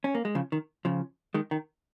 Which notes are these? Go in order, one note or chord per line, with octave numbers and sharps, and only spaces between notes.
C#4
A#3
G#3
C#3 F3
D#3
C#3 F3
D#3 G#3
D#3